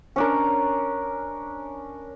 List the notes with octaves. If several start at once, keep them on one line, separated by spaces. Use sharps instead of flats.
C#4 D4 A#4